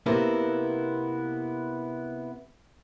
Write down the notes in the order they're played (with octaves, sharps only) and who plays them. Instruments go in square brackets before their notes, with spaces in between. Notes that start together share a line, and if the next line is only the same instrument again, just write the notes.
[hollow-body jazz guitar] C3 A#3 B3 E4